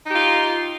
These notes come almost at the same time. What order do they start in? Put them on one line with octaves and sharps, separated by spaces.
D#4 G4 F4